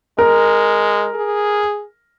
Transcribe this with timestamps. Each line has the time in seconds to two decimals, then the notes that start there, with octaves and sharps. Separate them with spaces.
0.19 G#3 A#4
1.15 G#4